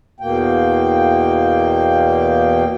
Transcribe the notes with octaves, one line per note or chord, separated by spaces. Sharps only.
E2 B2 A#3 G5